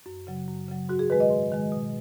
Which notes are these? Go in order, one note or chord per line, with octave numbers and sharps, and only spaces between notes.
F#2
C#3 F#3
F#2
C#3 F#3
G#2 F#4
G#4
D#3 G#3 B4
D#5
G#2
D#3 G#3
B2